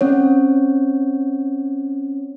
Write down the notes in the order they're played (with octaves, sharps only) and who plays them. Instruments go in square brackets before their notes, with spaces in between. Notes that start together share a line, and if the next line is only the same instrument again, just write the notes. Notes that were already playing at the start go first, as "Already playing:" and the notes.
[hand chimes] C4 C#4 C#5